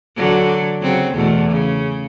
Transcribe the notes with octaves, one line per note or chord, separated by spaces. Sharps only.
D3 F#3
C#3 F#3 C4
E2 B2 A3
C#3